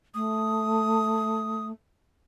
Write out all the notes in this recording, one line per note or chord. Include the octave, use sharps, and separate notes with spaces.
A3 D#6